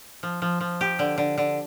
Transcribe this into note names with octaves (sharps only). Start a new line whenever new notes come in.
F3
F3
F3
G4
D3
D3
D3